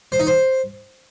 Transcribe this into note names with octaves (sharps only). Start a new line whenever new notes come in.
C5
D#4
C5